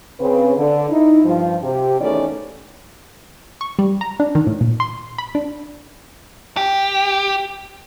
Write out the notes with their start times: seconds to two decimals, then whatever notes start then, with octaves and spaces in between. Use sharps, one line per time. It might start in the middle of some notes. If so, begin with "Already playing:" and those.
0.19 C#3 C4 B4
0.57 D3
0.90 D#4 E4
1.24 G2 F3
1.63 C3 G4
2.00 E2 D#3 A3 C#4 E4 D5
3.61 C#6
3.79 G3
4.01 A#5
4.20 D4
4.35 D#3
4.47 A2
4.61 A#2
4.80 C6
5.18 B5
5.35 D4
6.57 G4